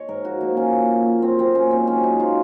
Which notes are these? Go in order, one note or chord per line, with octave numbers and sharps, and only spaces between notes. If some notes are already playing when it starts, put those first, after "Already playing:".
Already playing: C#5 D#5
G#2 A#4
F3 F#4
F3 A#3
F3 C#4
A#2
A#2
A#2
F#3 C4
F#3 C4
A#2 C#4
G#2 C4
F#3 C#4
G#2 D#4
F#3 F4